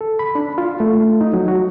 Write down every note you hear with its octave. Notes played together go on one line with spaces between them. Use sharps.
A4
B5
D4
F4
A3
D#4
F#3
F#4